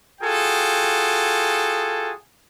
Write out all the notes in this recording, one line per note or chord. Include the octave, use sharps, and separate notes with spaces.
F4 F#4 G#4 A4 G5